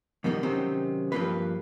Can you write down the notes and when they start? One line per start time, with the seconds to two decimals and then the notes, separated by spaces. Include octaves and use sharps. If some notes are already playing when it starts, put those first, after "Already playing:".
0.24 F2 B2 D#3 G3 A#3 D#4
0.43 C3 D#3 F#3 C4 C#4
1.12 G2 F3 G3 A#3 B4